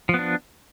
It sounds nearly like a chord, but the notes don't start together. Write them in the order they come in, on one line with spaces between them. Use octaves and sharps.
F3 B3 D4